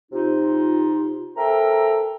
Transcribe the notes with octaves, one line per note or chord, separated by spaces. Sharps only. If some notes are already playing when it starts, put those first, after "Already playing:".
C3 D#4 F4
C4 A4 A#4 E5 G5 A#5